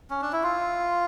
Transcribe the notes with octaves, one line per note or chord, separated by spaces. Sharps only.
C#4
D4
E4
F4